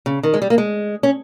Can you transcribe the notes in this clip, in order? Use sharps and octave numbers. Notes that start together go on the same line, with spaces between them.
C#3
D#3
G#3
G3
A#3
G#3
C#4